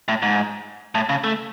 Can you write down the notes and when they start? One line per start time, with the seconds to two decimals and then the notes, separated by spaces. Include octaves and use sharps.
0.08 A2
0.22 G#2
0.95 A2
1.09 C#3
1.24 A3